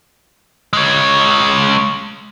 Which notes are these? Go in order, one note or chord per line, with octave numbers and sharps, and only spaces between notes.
G#3 C#5